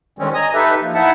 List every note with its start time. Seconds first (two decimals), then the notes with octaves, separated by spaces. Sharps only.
0.19 D3 D#3 G3 G#3 C4 C#4
0.34 D#5 G#5 A#5 D#6
0.54 D#4 G4 A4 B4 E5
0.82 F3 A#3
0.94 D#4 E4 E5 F#5 A5